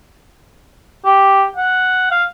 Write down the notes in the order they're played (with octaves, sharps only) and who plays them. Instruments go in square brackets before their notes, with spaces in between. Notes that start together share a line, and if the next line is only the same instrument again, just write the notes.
[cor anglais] G4
F#5
F5